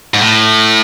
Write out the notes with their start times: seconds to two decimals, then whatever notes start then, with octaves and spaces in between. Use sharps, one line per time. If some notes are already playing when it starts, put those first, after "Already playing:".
0.14 G#2
0.21 A2